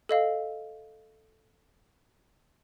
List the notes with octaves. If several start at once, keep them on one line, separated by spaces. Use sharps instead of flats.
A4 D#5 F5